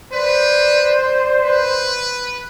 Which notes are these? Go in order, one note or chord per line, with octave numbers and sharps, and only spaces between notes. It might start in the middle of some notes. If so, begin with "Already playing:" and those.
B4 C5 D5
B4